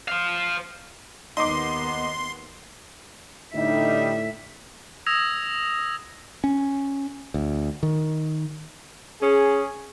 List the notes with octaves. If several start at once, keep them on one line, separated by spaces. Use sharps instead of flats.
C5 F5
D#2 B3 D#4 C6 D6
A2 D3 G3 D#4 E5
D#6 E6 G#6 A#6 E7 F7
C#4
D2
D#3
C#4 G#4